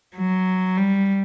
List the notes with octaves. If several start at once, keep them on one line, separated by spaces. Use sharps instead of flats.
F#3
G3